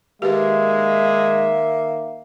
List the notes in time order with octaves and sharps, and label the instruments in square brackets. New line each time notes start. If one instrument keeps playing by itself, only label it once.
[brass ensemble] D#3 E5 [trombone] G#3 [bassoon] A#3 [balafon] G4 B4